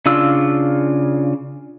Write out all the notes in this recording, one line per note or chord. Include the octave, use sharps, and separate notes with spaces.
C#3 D4 F4 E6